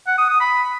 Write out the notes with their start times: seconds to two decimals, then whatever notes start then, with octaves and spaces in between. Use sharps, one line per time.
0.07 F#5
0.18 D#6
0.30 D#6
0.41 B5